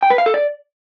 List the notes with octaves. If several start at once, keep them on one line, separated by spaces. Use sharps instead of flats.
G5
B4
F5
A4
D5